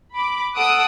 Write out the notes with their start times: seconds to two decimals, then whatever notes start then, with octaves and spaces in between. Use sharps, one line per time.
0.14 B5 D6
0.56 A4 F#5 D#6 E6 F#6 D7